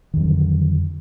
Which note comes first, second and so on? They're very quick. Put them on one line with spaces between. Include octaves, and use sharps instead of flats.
D#3 F2 F#3 D3